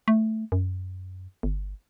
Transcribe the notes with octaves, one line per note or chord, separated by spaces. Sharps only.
A3
F#2
G1